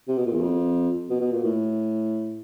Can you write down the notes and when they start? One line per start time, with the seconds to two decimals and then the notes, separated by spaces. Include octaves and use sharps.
0.08 C3
0.17 B2
0.26 A#2
0.34 E2
0.42 F2
1.10 B2
1.21 B2
1.32 A#2
1.44 A2